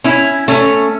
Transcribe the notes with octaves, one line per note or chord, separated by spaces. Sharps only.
C#4 E4
A3 C#4